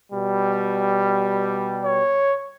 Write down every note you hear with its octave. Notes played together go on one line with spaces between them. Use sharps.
B2 G3
C#5